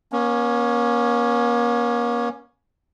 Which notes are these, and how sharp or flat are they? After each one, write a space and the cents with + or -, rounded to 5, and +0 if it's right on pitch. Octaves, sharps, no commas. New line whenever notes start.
A#3 +40 C#4 +0